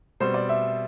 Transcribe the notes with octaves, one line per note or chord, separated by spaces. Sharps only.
B2 G3 C4 C5
D5
E5